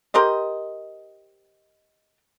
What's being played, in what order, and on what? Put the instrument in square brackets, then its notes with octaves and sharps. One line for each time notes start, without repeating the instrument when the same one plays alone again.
[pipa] G4 A#4 C5 D#5